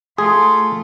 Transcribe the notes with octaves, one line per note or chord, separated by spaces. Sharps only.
A3 F4 G#4 C6